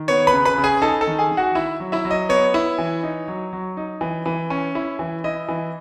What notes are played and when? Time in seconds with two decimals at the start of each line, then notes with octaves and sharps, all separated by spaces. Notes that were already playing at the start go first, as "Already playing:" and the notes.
Already playing: D#3
0.08 B3 C#5 C#6
0.27 B4 B5
0.33 C#3
0.45 B4 B5
0.58 C#3
0.64 G#4 G#5
0.82 D#4 A4 A5
1.01 A4 A5
1.07 D#3
1.19 G#4 G#5
1.31 D#3
1.37 F#4 F#5
1.55 E4 E5
1.80 F#3
1.92 E4 E5
2.05 F#3
2.11 D#5
2.29 B3 C#5
2.54 E4
2.78 E3
3.03 D#4
3.28 F#3
3.53 F#3
3.77 D#4
4.01 E3
4.26 E3
4.50 C#4
4.75 E4
4.99 E3
5.24 E4 D#5
5.49 E3